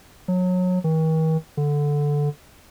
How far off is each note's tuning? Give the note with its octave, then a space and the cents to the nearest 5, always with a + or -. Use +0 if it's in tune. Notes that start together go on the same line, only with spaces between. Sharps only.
F#3 -25
D#3 +45
D3 -5